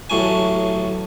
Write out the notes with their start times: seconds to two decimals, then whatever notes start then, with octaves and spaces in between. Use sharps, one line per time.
0.10 A1 A2 F#3 G#5